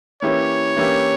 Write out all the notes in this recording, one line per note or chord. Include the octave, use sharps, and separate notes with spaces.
E3 A#3 C#4 E4 G4 C#5
E3 A#3 C#4 E4 G4